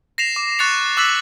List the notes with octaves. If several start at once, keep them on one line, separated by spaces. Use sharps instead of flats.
A#6 C7 E7 F7
D6
C#6 F#6 A6 A#6 C#7 F7
D6 E6 F#6 A6 B6 F#7